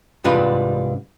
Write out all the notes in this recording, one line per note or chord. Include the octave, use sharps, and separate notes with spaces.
C2 G#2 G3 D4 F4 B4